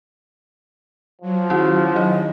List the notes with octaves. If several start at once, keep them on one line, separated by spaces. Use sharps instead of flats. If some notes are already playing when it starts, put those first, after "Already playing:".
F3 F#3
D#3 C#4 E4 F#4
D#3 D#4 D#5